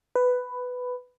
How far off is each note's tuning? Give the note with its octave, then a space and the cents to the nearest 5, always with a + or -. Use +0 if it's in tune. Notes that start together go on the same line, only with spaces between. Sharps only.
B4 +10